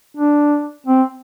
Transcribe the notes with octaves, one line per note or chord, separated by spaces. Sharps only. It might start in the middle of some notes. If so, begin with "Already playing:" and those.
D4
C4